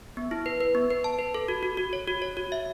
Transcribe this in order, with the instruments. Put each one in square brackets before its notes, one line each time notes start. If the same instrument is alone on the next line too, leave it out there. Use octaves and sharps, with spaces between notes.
[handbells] B3
E4
B4
B4
B3
B4
A5
B4
A4
F#4
F#4
F#4
C#5
F#4
C#5
F#4
E5